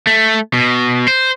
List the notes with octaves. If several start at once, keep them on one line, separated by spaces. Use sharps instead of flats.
A3
B2
C5